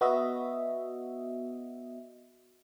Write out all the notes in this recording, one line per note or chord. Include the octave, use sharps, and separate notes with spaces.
B3 F#4 D#5 E5